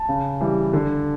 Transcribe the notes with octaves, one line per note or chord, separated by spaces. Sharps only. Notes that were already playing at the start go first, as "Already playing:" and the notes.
Already playing: A5
C#3
E3 G3
D3